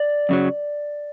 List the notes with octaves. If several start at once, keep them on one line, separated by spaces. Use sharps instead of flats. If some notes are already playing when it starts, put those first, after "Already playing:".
Already playing: D5
F#2 C#3 F#3